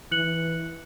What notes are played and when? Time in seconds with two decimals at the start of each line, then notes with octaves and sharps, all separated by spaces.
0.11 E3 F#6 C#7 F#7